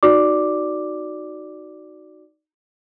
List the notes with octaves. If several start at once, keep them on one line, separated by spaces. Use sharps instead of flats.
D#4 F#4 D5 D6